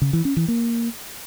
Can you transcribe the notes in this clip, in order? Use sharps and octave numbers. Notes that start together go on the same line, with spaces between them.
C#3
E3
C#4
E3
A#3